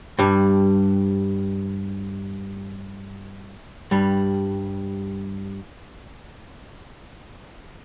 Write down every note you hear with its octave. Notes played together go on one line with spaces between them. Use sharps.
G2 G3
G2 G3